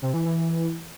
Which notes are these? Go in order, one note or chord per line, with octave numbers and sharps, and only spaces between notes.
C3
E3
E3